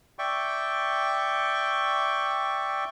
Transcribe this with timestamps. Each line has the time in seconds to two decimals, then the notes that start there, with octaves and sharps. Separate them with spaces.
0.19 D5 E5 G5 C#6